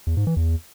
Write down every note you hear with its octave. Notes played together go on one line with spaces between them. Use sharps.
E2
G#2
E3
E2